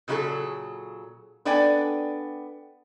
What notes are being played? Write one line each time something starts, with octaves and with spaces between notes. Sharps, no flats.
A#2 C#3 F#3 E4 G#4 A4
B3 D4 A4 D5 G5 G#5